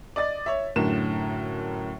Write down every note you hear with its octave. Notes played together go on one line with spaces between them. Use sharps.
D5 D#5 A6
C#5 E5
F#2 A2 D3 A#4 E7